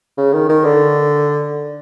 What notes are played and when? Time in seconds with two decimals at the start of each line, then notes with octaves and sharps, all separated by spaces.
0.18 C#3
0.33 D#3
0.49 D#3
0.65 D3